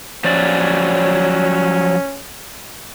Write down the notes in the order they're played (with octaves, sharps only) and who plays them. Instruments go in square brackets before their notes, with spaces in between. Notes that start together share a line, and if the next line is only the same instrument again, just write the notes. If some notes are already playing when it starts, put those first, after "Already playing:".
[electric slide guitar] F3 F#3 D5 [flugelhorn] C#4